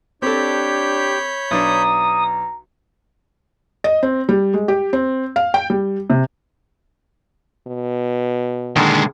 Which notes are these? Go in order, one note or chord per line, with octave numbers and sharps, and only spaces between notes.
C4 D4 G4 A4 C#5 B5 G6
B1 D4 A#5 D#6
D#5
C4
G3
G#3
G4
C4
F5
G5
G3
C3
B2
A#2 D3 D#3 G#3